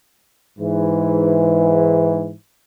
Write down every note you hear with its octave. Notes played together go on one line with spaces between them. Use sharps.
G#2 E3